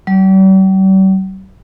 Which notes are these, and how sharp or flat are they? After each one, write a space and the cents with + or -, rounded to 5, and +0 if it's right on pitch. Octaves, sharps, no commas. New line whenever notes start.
G3 -45